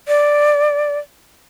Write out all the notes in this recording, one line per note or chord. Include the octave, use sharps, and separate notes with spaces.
D5